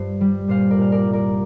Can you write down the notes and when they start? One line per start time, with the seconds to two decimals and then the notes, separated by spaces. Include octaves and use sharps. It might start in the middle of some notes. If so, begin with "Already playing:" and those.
Already playing: G2 C5
0.21 G3
0.48 A#2 C5 F5
0.70 A#4 D5
0.78 A#2 F5
0.92 A#4 D5
1.06 C2
1.13 A#4 D5